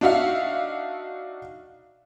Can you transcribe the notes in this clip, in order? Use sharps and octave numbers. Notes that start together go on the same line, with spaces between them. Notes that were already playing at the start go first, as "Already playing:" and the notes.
D4 D#4 F#4 E5 F5